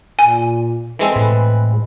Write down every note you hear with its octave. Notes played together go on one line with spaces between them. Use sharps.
A#2 G#5
E3 G#3 C4 A4
A2 B4